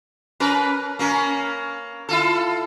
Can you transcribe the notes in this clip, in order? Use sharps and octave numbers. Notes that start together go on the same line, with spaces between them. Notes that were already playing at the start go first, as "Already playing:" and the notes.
C#4 A#4 B4
A#3 C#4 A#4
E4 F4 A4